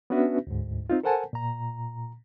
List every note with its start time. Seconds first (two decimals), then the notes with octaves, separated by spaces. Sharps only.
0.10 B3 C#4 D4 F#4 B4 E5
0.47 D2 G#2
0.90 C4 D#4 F4
1.04 A4 A#4 C5 F#5 G#5 A5
1.33 A#2 A#5